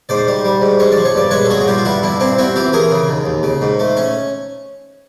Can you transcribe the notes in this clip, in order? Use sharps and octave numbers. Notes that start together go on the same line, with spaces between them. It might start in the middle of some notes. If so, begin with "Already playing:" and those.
G#2 C5 D5
G3
G3
G#2
G#3 C#5
D5
F3
C#5
G2 D5
G#3 B4 C#5
A4
G2 F#4 G#4
F#4
G2 F4 G4
F4
G2 E4 F#4
G2 D4 E4
C4 D4 E4
C4 E4 F#4
E3 F4 G4
E3 G#4 A#4
C#3
D#2
D#2
C#3
G#2
A3
C#4